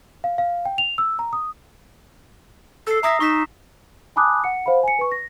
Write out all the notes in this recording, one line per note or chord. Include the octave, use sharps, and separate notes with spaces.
F5
F5
G5
F7
E6
A#5
D#6
A4 E6 C7
E5 A#5 D#6 A#6
D#4 C#6 B6 E7
G#5 A5 B5 D6 D#6 F#6
F#5 C#7
C5 F5 F#5 B5
G#5 C#7
B4 C#6
A#6